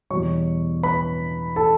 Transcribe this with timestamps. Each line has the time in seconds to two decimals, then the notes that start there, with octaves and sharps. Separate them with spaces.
0.10 E2 B2 G3 C#5 C#6
0.83 B4 B5
1.56 A4 A5